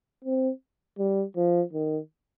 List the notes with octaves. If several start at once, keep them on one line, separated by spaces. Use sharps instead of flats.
C4
G3
F3
D#3